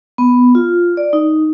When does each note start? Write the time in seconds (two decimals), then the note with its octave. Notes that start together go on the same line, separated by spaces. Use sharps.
0.18 B3
0.55 F4
0.97 D5
1.13 D#4